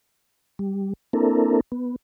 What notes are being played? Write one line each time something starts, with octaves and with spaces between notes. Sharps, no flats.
G3
A#3 C4 D4 E4 A4 A#4
B3